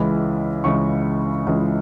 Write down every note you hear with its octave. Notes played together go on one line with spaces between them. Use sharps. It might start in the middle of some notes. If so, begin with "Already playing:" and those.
Already playing: C#2 C#3 E3 G#3 B5
C#2 C#3 E3 G#3 C#6
C#2 C#3 E3 G#3